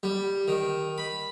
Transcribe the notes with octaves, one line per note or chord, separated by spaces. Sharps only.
G3
D#3
B5